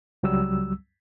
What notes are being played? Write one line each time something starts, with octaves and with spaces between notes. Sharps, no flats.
C#2 F#3 G3 E6